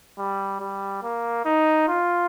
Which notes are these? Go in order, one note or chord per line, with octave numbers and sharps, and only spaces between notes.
G3
G3
A#3
D#4
F4